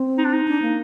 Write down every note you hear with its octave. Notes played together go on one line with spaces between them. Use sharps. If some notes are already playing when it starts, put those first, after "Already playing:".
Already playing: C4
D#4
D4
D#4
D4
A#3